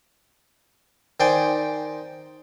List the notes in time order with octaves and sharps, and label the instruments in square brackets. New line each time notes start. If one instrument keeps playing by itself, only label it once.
[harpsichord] D#3 C5 D5 G5 G#5